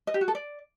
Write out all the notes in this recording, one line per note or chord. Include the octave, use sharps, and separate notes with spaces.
D#5
G4
F#4
A4
D5